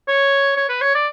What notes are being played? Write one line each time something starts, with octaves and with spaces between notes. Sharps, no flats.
C#5
C#5
B4
C#5
D5